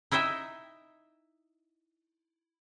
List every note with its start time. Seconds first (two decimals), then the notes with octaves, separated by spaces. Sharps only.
0.12 D#4 E4 D#5 E5 G5